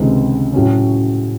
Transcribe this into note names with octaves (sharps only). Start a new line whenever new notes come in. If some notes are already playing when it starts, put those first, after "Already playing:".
Already playing: C#2 C3 D#3 G#3
A2 F#3 C#4